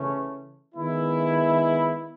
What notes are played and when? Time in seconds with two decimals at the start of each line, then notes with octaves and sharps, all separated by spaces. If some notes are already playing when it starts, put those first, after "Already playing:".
Already playing: C#3 E3 A3 C#4
0.75 D#3 G#3 B3 E4